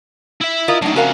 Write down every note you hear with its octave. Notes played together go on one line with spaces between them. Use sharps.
E4 E5
F4 A#4 D#5
F#2 A2 D4 D#4
F2 C#3 F#4 A#4 F5